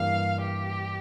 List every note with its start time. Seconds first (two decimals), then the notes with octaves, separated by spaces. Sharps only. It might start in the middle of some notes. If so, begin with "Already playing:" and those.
Already playing: G2 E3 A#3 F5
0.41 G4